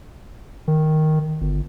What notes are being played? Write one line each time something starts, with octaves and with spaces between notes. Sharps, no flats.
D#3
G1